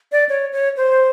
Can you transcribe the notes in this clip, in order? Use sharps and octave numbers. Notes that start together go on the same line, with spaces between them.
D5
C#5
C#5
C5